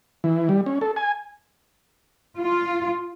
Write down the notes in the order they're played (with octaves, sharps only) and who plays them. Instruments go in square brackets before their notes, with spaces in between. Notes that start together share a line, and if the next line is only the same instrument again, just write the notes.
[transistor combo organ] E3
G3
C#4
A4
G#5
[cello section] F4